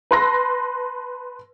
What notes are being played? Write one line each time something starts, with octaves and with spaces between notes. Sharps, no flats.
B4 A5 C6 E6 A#6